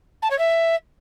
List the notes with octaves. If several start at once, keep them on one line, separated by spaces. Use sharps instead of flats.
A5
C#5
E5